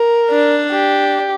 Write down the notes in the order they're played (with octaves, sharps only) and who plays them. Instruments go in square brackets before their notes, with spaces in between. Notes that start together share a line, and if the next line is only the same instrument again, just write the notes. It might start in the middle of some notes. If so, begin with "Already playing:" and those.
Already playing: [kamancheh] A#4
[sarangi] D4
[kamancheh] G4